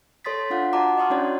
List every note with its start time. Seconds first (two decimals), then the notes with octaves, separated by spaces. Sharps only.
0.25 A4 C#5 C6 D#6 A6 B6
0.50 D4 F4 F5 F#5
0.73 F#4 D#5 F#5 A5 A#5 D6
0.98 D#5 C6 C#6 D#6 F6
1.10 C#4 D4 E4 F#4 C#5 D5